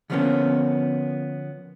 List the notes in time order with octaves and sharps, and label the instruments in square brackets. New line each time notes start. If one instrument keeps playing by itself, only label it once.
[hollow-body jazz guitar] D3 F3 G3 A#3 B3 C#4